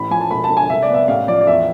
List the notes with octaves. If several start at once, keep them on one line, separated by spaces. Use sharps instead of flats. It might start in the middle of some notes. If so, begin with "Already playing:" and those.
Already playing: A1 E3 B5
F3 G#5
A5
E1 B5
A5
D3
G#5
C2 E5
D5
B3 E5
A1 F5
F3 D5
D5
E2 E5